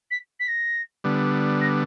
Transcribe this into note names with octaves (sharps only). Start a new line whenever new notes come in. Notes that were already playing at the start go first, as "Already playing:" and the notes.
B6
B6
A#6
D3 G3 B3
A#6